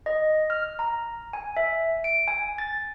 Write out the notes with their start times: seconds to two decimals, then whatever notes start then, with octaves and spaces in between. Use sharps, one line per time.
0.06 D#5
0.50 F6
0.79 A#5
1.33 G#5
1.57 E5
2.04 D7
2.28 G#5
2.58 A6